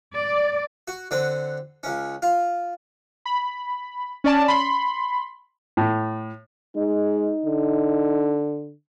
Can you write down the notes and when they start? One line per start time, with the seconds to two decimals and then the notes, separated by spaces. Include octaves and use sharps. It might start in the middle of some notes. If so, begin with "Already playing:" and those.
0.15 D5
0.88 F#4
1.11 D3 C4 F#5
1.83 C#2 C#4
2.22 F4
3.26 B5
4.24 C#4 D5 A5
4.48 B5 C6
5.77 A2
6.76 G#3 D#4
7.46 D3